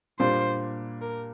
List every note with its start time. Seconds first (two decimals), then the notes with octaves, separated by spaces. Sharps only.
0.20 A#2 G3 A#3 D4 F4 C5
1.01 A#4